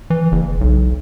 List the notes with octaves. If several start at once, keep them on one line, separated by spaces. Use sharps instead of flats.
E3
F#1
B1